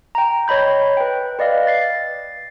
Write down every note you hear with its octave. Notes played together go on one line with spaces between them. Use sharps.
G5 A#5
C#5 D#5 B5 G6
B4 G5
B4 D5 D#5 F5
A6 C7